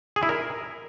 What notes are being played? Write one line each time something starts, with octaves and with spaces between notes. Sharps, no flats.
G#4
E4
A#4